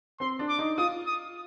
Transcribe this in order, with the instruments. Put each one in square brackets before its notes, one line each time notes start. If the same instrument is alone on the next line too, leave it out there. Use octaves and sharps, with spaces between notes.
[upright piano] C4 [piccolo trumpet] C6
[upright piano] D4
[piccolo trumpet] D6
[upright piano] D#4
[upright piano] F4 [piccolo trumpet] D#6
[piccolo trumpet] D#6